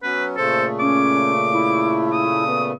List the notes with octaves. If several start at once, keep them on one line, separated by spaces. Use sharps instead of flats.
F#3 B3 C#4 B4
A#2 C#3 A3 A4 C5
C#4 D6
E4
D#6
B3